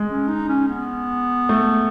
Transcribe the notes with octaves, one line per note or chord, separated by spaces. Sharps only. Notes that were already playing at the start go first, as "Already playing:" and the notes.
Already playing: G#3
C#4
D#4
C#4
B3
A3